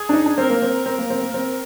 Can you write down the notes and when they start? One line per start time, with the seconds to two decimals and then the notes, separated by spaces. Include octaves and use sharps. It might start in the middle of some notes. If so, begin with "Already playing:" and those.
Already playing: G#4
0.09 D4
0.13 D#4
0.26 D4
0.38 C4 A#4
0.50 A#3
0.62 C4
0.86 C4 A#4
0.98 A#3
1.10 C4
1.21 A#3
1.33 C4 A#4